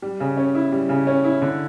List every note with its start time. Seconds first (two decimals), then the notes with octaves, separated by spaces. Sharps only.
0.02 G3
0.20 C#3
0.37 C#4
0.55 E4
0.72 G3
0.89 C#3
1.07 C#4
1.24 E4
1.42 D3